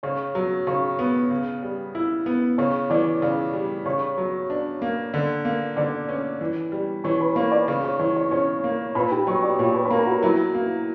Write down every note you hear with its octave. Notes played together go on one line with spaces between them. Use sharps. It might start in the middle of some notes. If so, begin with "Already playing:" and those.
C#3 C#5 C#6
F#3
C#3 C#5 C#6
B3
C#3
G3
E4
B3
C#3 C#5 C#6
E3 D5 D6
C#3 D5 D6
G3
C#3 C#5 C#6
F#3
D4
A#3
D3
A#3
D3 D5 D6
C#4
E3
G3
E3 C#5 C#6
B4 B5
A#3 C#5 C#6
D5 D6
C#3 C#5 C#6
C#5 C#6
E3 C#5 C#6
C#5 C#6
C#4 C#5 C#6
A#3
A#2 B4 B5
G4 G5
F#3 C#5 C#6
D5 D6
A#2 C#5 C#6
B4 B5
B5
A#3 A#4 A#5
F#4 F#5
F#3 E4 E5
A#3